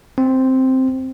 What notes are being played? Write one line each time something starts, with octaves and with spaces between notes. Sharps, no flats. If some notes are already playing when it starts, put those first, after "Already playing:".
C4